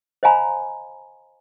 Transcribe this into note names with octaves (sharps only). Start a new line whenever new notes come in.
C5 D#5 F5 G#5 A#5 B5